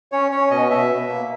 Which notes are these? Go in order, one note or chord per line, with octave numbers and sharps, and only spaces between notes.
C#4 C#5
C#4 C#5
B2 D#5
B2 E5
B2
A#3